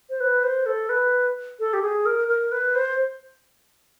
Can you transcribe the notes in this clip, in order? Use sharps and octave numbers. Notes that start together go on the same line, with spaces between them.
C5
B4
C5
A4
B4
A4
G4
G#4
A#4
A#4
B4
C5